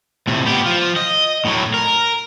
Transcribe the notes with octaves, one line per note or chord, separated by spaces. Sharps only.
A2 C3
B3 G4
F3
D#5
A2 F#3
A#4